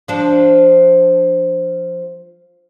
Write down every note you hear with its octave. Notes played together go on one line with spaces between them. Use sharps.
F3 D4